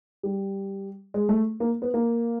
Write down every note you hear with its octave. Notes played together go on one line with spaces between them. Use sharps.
G3
G#3
A3
A#3
B3
A#3